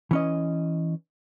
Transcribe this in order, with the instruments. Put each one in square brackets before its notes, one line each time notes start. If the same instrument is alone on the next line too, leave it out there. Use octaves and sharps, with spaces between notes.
[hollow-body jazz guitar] E3 C#4 D#5